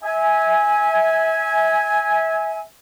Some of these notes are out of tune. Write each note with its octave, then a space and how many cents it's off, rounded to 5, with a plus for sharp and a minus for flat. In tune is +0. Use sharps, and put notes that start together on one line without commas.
E5 -25 G#5 +0